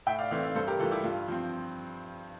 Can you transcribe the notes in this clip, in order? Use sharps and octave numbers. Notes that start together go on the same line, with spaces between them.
A2 E5 G5
D5 F5
E3 A3 C4 D5 F5
D5 F5
G2 A4 C5
G4 A#4
E3 G3 F4 A4
E4 G4
G2 F4
F3 C4